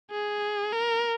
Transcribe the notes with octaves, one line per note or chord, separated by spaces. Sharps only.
G#4
A#4